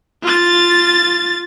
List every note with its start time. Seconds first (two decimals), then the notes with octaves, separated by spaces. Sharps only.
0.23 F4 A6